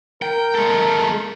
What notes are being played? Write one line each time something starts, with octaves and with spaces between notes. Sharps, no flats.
A#4 G5
G#3 A4